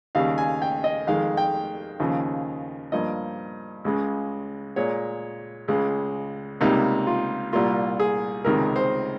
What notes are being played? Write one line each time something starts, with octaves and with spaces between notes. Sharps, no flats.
D#2 C#3 G3 F5
G#5
G5
D#5
F2 D#3 G#3 F5
G5
D#2 C#3 F3
G2 F3 A#3 D#5
C#2 C#3 G#3
A#2 G#3 C#5
C#2 C#3 G#3
C#2 C3 G3 A#3 D#4
F4
C2 A#2 G3 A#3 F4
G#4
C#2 C3 D#3 G#3 A#4
C5